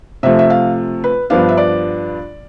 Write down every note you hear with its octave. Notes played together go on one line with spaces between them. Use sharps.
C3 F3 A3 E5
E5
F5
B4
G2 F3 B3 D4 F5
E5
D5